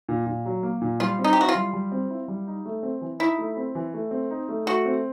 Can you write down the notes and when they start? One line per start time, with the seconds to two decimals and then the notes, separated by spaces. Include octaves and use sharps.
0.09 A#2
0.26 A#2
0.46 F#3
0.63 A#3
0.82 A#2
1.00 G3 F4
1.19 C4
1.24 D#4
1.33 G4
1.37 E4 F#4
1.49 F4
1.55 G3
1.73 G3
1.92 C4
2.10 E4
2.28 G3
2.47 D#4
2.66 A3
2.83 C4
3.01 E3
3.19 D#4 E4
3.38 A3
3.57 C4
3.75 E3
3.94 A3
4.11 C4
4.31 D#4
4.49 A3
4.66 A3 F#4
4.85 C4